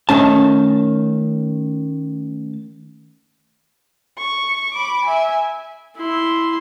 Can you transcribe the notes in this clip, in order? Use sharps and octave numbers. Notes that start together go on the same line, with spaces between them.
D#3 A3 C#4 A5
C#6
B5 D6
E5 G#5
E4 C6